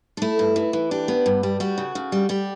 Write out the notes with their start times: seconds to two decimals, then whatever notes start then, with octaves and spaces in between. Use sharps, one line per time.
0.17 D4
0.22 A3 E4
0.39 G2
0.56 E3
0.73 E3
0.91 D4 G4
1.08 B3
1.26 G2
1.43 G3
1.60 G3 F#4
1.78 C#3
1.95 C#3
2.12 G3
2.29 G3 G4